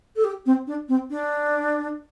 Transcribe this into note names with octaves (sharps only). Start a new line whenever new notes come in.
A4
G4
C4
D4
C4
D4